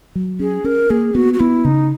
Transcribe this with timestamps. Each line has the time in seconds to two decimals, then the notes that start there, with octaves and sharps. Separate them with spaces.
0.15 F#3
0.40 C#4 G#4
0.64 C#4 A#4
0.90 A#3 G#4
1.15 B3 F#4
1.34 F#4
1.40 B3 E4
1.65 C#3 D#4